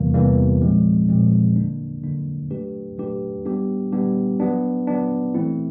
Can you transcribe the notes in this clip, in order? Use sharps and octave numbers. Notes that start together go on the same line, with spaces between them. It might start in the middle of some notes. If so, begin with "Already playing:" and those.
Already playing: E2 C3 E3 G3 A#3
E2 C3 E3 G3 A#3
A#2 F3 G#3 C4
A#2 F3 G#3 C4
F2 D3 F#3 A#3 D4
F2 D3 F#3 A#3 D4
F#3 A3 D4 G4 B4
F#3 A3 D4 G4 B4
G3 B3 D4 G4
G3 B3 D4 G4
F#3 B3 D4
F#3 B3 D4
E3 A3 C4 E4